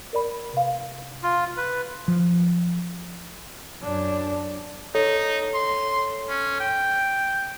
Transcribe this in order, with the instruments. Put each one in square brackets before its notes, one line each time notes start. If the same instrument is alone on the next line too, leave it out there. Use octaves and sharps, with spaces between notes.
[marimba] A#4 D5 B5
C3 F5
[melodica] F4
B4
[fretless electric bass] F3
[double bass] F#2 D4
[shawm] D#4 [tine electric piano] A4 C#5
[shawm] C6
C#4
G5